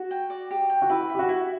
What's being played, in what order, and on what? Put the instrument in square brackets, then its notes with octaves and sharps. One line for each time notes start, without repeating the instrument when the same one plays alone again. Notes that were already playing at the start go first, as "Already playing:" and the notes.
Already playing: [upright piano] F#4
[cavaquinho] G5
D5
G4
G5
[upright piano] F#4
[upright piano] E4 [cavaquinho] B4
[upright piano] G4 [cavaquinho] E5
[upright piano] F#4
[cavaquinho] E4